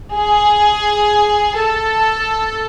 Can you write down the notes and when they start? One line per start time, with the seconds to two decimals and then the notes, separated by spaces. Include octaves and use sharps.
0.14 G#4
1.59 A4